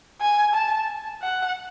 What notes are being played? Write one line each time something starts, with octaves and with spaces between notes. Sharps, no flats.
G#5
A5
F#5